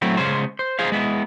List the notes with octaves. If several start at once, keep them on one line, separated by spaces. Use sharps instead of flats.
F#3 A3 C4 E4
C#3 G#3 C#4 C5
C5
G#4 C5 F5
G#3 B3 E4